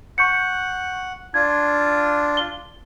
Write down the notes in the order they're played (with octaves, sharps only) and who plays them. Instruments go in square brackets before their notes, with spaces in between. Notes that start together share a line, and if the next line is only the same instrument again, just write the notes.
[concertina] F#5 [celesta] C#6 G6 C#7
[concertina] D4 F4 [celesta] G#6
[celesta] G7